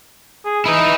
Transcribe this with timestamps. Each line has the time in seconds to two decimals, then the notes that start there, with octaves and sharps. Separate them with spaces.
0.45 G#4
0.65 D#4 E4 B4